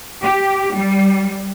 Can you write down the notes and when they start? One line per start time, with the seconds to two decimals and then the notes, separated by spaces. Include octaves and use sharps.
0.22 G4
0.76 G3